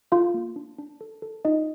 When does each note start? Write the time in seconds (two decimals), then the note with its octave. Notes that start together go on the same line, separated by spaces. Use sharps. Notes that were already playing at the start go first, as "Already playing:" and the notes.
0.12 F4 A4 F5
0.34 A#3
0.56 D4
0.78 D4
1.01 A4
1.22 A4
1.45 D#4 F4 D#5